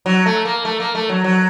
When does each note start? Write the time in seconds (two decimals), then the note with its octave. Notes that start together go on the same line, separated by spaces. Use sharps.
0.06 F#3
0.26 A3
0.45 A#3
0.65 A3
0.80 A#3
0.95 A3
1.09 F#3
1.24 F#3